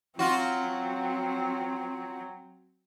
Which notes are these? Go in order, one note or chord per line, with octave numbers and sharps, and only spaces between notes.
F#3 C4 F4 F#4